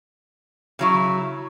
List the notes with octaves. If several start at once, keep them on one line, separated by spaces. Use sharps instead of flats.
C#3 F#3 E4